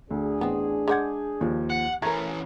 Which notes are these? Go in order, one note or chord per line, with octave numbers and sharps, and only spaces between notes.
D2 D4 G#4
A1 B3 C4
G#3 A#4 F#5 D6 G6 G#6
D#2 F3
F#5
E3 A3 C#4 A#4 A#5 G#6